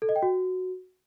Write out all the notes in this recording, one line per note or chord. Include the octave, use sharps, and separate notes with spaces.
A4
D#5
G5
F#4